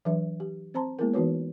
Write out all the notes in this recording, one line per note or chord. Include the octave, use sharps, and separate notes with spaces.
E3 F#3 D4 B4 E5
G4
C4 C5 A5 A#5 C6
G#3 A#3 B3 E4 G#4 A#4
E3 B3 D#4 F#4 B4 C#5